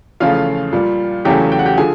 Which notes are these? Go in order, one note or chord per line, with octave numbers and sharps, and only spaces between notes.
E2 C#3 F3 A3 F4 F5
A#2 G3
E2 C#3 F#3 A3 G4 G5
G5
F#5
G4 G5
D3 F3 G#4 G#5